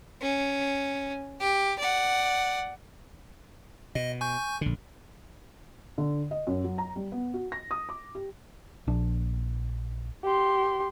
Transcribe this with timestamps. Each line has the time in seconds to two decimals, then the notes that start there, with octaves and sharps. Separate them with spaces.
0.21 C#4
1.40 G4
1.79 D5 F#5
3.95 B2 D#5
4.21 G#5 C#6 G6
4.61 A#1 D3
5.98 D3
6.31 D#5
6.47 F#2
6.64 F#3
6.78 A#5
6.96 G3
7.12 B3
7.34 F#4
7.52 A#6
7.71 D#6
7.89 D6
8.15 G4
8.87 A#1 D4
10.24 G4 C6